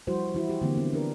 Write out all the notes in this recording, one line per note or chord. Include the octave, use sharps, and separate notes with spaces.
F3 G3 E4 F#4 C5
E3 E4 F#4
G4
D3 E3 F3 A#3 C4
B3
D4 A#4